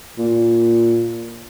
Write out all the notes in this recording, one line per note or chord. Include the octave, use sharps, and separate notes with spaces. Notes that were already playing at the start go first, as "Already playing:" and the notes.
A#2